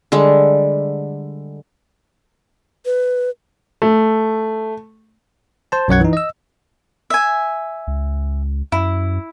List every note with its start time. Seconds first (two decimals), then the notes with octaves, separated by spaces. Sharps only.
0.12 D3 G3 G#3
2.85 B4
3.82 A3
5.72 C5 A5
5.88 B1 F#2 C#5 F#5 G#6
6.00 E3 D#4
6.13 D#5 E6
7.10 E5 G#5
7.87 C#2
8.72 F#2 E4